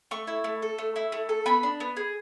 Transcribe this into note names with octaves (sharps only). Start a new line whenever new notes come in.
A3 C#6
E4
A3
A4
A3
E4
A3
A4
B3 B5
D4
B3
G#4